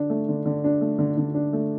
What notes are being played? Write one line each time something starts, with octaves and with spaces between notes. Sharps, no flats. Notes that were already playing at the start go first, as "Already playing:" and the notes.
Already playing: D3 D4
A3
D3
D3
D4
A3
D3
D3
D4
A3